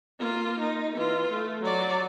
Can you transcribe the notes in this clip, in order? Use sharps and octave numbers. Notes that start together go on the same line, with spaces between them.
A#3 F4
D#4
E3 F4
A3
F#3 D5